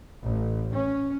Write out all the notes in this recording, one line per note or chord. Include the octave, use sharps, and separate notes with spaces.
A1
C#4